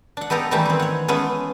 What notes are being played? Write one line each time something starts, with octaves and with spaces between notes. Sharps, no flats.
D4 F#5
G#3 B3 G4 A4 A#5
D#3 E3 G3 A3 G4
C4 G#4
C#5 F#5
G#3 A3 B3 C#4 G#4